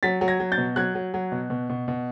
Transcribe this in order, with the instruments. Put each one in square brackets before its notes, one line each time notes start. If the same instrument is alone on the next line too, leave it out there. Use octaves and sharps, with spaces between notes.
[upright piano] F#3 A6 B6
F#3
G#6 A#6
F#3
G6 A6
B2
F#3 F#6 G#6
F#3
F#3
B2
B2
B2
B2